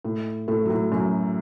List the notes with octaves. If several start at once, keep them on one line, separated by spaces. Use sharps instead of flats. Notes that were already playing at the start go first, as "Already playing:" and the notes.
A2
A2 A3
F#3
A2 A3
F#2 F#3